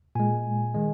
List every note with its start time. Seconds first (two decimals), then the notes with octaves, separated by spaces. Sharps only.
0.15 A#2 G#3 G#5
0.75 D#3 G#3